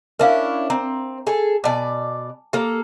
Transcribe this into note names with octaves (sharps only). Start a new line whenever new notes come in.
C#4 D4 E4 A#4 E5 F5
C4 A#5
G#4 A4
B2 D5 G#5 A5 D6
A#3 G4 A4